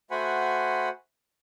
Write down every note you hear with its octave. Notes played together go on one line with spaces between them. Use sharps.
A3 F#4 C5 F#5 G#5 B5